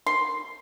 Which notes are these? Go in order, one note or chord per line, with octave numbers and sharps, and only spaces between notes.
C6